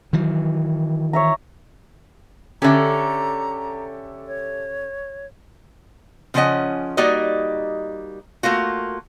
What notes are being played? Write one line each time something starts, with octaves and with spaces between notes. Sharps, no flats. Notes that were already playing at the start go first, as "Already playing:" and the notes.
D#3 E3 F#3
C#5 E5 A#5
D3 C#4 G4 A4 E5 A#5
C#5
C#3 F3 B3 C#4 D#5 F#5
G3 A#3 D#4 F#4 D5 D#5
A3 A#3 F4 F#4